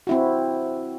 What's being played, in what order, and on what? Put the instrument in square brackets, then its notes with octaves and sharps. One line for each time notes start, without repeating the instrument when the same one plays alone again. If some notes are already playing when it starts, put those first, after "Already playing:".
[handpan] C4 E4 F#4